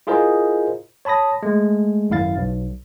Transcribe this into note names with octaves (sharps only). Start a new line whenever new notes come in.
E4 F4 G#4 A#4 C5 D#5
C#5 A5 B5 D#6 A#6
G#3 A3
G#1 F#2 E4 F5 A6
B1